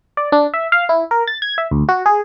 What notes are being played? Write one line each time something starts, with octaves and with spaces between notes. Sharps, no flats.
D5
D4
E5
F5
E4
A#4
A6
G#6
E5
D2
F#4
G#4